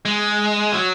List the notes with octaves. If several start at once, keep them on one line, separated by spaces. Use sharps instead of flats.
G#3
F#3